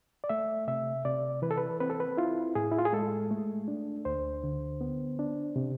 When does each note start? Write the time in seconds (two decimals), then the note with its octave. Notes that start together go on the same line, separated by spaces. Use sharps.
0.24 D5
0.29 A3 E5
0.68 C3 E5
1.05 C3 D5
1.42 E3 B4
1.51 A4
1.58 B4
1.80 C4 B4
1.90 A4
2.00 B4
2.17 E4 F4
2.55 A2 G#4
2.72 E4
2.78 F4
2.85 G#4
2.93 G#3 A4
3.31 A3
3.68 D4
4.05 D2 C5
4.44 D3
4.81 B3
5.19 D4
5.56 C3